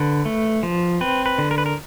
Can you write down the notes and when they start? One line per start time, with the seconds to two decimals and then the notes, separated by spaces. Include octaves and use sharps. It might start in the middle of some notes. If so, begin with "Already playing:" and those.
Already playing: D3 B4
0.25 A3
0.63 F3
1.01 C4 B4
1.26 B4
1.38 D3
1.51 A#4
1.58 B4
1.66 A#4